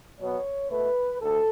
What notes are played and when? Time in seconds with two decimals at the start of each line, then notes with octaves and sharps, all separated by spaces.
0.20 B2 F#3 B3 C#5
0.70 B2 A3 B4
1.20 D2 A4